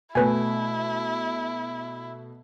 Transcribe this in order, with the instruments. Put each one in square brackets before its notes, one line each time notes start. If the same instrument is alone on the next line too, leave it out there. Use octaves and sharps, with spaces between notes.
[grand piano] B2 A3 [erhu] E4 [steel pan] B4 G#5